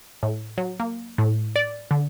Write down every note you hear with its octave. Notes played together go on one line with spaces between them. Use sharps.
A2
F#3
A#3
A2
D5
D3